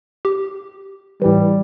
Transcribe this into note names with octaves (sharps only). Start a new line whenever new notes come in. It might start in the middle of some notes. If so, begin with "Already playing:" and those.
G4
A2 E3 G3